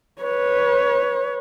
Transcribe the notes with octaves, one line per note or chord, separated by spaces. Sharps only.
B4 C#5